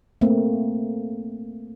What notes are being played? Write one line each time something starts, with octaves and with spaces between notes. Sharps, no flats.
A3 A#3 C4